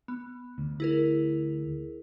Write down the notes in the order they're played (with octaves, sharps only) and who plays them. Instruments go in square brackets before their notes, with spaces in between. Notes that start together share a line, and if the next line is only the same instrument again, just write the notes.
[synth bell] B3
[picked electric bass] D2
[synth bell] E4 G#4 A#4